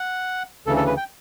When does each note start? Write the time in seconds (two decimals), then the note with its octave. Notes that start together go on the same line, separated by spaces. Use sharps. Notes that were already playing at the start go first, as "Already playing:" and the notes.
Already playing: F#5
0.66 D2 C#3 E3 A4
0.77 A4
0.86 B4
0.97 G5